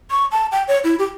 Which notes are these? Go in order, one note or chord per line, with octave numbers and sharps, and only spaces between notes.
C#6
A5
G5
C#5
E4
G4